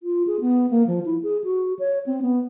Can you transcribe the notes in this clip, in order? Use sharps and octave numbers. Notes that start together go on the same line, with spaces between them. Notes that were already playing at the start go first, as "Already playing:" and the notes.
F4
G#4
B3
A#3
F3
E4
G#4
F#4
C#5
C4
B3